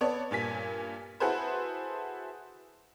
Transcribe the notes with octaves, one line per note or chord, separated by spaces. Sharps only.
B3 A4 C#5 D5
G2 A#2 G#5 B6
E4 F#4 G#4 A4 B4 C5